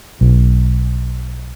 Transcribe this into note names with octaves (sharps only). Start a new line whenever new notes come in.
B1